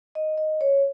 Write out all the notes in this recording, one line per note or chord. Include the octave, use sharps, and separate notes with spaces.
D#5
D#5
C#5